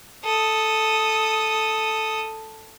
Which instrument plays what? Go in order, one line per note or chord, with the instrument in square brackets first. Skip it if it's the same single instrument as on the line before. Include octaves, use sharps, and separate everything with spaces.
[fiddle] A4 D#6